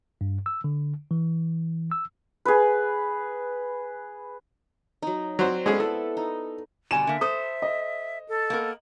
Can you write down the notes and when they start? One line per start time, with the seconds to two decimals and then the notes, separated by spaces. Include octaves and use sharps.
0.21 G2
0.46 E6
0.64 D3
1.11 E3
1.92 E6
2.45 G#4 B4
5.02 F#3 D#4
5.39 F#3 C4 F#4 C5 D5
5.66 G#3 B3 C#4 G#4 A4 B4
5.80 E4 A4
6.17 D#4
6.91 B2 D3 G3 G#5 E7
7.07 D3 A#3 E5
7.21 A4 C5 D#6
7.62 D#5
8.29 A4
8.50 A#3 B3 A#4